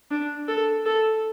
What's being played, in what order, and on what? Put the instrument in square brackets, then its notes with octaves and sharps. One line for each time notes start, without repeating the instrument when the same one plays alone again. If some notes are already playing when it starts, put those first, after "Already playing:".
[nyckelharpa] D4
A4
A4